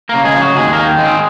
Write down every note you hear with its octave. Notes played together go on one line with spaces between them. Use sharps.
C#3 A#3 A#4
G#3 G#4
F3
F#3 F#4
D#2 G#3 G#4
A#3 A#4
D#3
G#3
C4